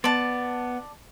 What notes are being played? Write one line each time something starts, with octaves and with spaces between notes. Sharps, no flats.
B3 D5 A5 C6